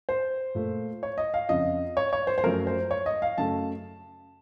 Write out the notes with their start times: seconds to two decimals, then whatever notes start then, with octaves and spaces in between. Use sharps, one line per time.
0.09 C5
0.55 A#2 A3
1.03 C#5
1.18 D#5
1.34 F5
1.49 F2 C#3 F3 D#5
1.97 C#5
2.13 C#5
2.27 C5
2.38 C5
2.43 F#2 F3 A3 A#4
2.67 C5
2.91 C#5
3.06 D#5
3.22 F5
3.38 F#2 C#3 A3 A5